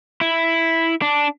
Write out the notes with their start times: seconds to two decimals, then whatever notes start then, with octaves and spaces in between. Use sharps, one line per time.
0.21 E4
1.02 D4